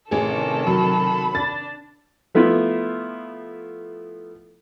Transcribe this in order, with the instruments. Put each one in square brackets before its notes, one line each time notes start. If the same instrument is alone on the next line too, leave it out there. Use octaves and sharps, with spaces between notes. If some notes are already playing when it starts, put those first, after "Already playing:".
[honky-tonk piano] A1 G#4 [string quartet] C3 D#3 A4
[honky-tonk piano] F#3 [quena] B5
[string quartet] D4 [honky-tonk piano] A6
[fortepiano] F3 A3 B3 E4 F4